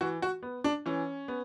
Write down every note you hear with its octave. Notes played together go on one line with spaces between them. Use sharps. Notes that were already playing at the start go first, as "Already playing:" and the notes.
E3 F#4
F#4
B3
D4
E3 C#4
B3